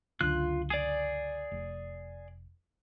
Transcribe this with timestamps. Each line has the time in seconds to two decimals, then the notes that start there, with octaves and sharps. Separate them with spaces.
0.21 C#2 F#2 D3 F4 F#6
0.70 G#4 D5
1.52 F1